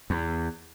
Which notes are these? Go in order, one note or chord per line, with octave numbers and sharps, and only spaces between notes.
E2